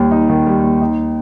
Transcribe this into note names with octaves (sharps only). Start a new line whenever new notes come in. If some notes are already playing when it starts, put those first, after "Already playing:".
Already playing: D#2 G3
D#4
D#3
G3
D#2
D#4